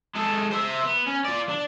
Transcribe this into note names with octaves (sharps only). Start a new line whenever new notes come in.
G#3 A4
C5 E5
B3
C#4
F4 D5
D4